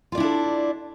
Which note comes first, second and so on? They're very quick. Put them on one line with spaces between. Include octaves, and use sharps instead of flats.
F4 D5 E4 D4 A4